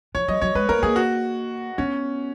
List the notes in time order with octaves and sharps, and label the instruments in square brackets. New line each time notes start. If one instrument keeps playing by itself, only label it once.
[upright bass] F3 [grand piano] C#5
[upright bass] F#3 [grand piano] D#5
[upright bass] F#3 [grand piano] C#5
[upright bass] G#3 [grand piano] B4
[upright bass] A#3 [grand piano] A#4
[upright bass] A#3 [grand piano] G#4
[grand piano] F#4
[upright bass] B3 [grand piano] C#4